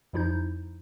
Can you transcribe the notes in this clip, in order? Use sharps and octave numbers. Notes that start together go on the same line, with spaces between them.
F2 F3 D#4 E4 G6